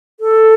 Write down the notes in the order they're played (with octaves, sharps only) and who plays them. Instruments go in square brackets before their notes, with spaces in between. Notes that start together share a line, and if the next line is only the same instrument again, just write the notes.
[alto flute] A4